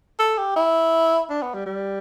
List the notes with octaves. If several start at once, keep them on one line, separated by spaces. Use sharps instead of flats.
A4
G4
E4
D4
B3
G3
G3